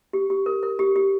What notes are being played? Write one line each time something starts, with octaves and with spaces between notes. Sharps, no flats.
G4
G4
A#4
A#4
G4
G4